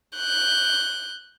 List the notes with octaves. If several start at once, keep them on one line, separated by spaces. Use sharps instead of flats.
F#6 G6